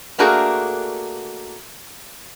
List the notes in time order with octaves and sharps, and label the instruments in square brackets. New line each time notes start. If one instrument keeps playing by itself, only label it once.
[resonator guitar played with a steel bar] A3 A#3 D4 F#4 G#4 A#4